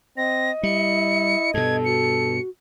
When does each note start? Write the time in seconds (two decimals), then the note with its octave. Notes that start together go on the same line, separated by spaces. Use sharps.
0.17 C4 D#5 A#6
0.63 G3 E4 C#7
1.54 G2 B2 A4 G#6
1.85 F#4 C#7